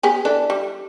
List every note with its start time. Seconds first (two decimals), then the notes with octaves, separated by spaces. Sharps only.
0.03 B3 G4 G#4
0.25 E3 D4 A4
0.50 G3